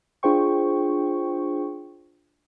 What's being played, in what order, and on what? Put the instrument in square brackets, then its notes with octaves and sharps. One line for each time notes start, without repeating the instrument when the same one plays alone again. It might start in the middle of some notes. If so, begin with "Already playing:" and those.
[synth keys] D4 F4 G#4 C5 G5 C#6